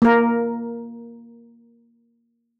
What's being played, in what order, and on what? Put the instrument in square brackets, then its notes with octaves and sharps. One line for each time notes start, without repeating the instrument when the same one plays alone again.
[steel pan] A#3 A#4